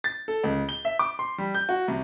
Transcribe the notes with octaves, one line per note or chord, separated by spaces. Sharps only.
A6
A4
C#2
G7
E5
D6
C6
G3
G6
F#4
C2